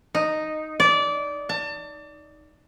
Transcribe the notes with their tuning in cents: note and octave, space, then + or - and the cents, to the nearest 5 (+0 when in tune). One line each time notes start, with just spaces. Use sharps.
D#4 -5
D5 -20
A5 +30